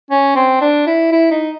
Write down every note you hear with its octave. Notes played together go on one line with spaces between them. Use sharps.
C#4
C4
D4
E4
E4
D#4